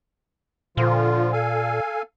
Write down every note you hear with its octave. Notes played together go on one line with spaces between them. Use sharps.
A#2 D3 F3 F4
A4 F5 G#5